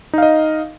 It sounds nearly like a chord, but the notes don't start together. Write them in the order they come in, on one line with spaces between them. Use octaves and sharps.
D#4 F5 D#5